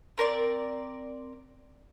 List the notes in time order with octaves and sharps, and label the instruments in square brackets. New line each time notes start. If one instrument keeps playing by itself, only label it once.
[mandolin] C4 A#4 C5 D5